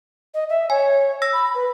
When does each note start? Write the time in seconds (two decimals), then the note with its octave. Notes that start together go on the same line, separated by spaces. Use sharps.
0.34 D#5
0.49 E5
0.70 C#5 G#5
1.22 E6 A#6
1.33 B5
1.55 B4